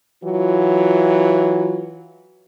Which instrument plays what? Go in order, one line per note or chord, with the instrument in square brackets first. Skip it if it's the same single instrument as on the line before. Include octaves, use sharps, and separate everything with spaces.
[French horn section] E3 F#3 F4